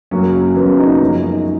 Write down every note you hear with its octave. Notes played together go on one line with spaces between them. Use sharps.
F#2 C#3 F#3 A#3 C#4
F#2 C#3 F#3 A#3 B3
B3
D#4
B3
F#2 F3 G#3 C#4
D#4